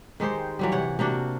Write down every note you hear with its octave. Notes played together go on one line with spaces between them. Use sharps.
D#3 G#3 G4 C5
E3 F#3 G3
C3 C#5 F#5
C3 A#3 D4 F#4